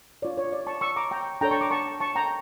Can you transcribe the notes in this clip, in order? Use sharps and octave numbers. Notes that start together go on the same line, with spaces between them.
D4 F4 C#5 D5
C#5
D5
A5 C#6
C#6 E6
A#5 D6
G5 A#5
D4 A4 C#5 G5 A#5
A5 C#6
A#5 D6
A5 C#6
A5 C#6
G5 A#5